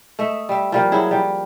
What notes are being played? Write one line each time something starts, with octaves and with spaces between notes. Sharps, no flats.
A3 D#5 E5
G3 E5
F3 G3 A#3
F#3 E4 G#4
F3 G3